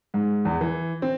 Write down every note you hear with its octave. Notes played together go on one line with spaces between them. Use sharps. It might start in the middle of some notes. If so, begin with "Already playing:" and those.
G#2
E2
E3
C4